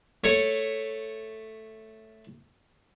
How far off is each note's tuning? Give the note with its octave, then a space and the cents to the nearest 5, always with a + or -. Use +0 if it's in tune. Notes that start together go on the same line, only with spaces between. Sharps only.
A3 +0 C#5 +0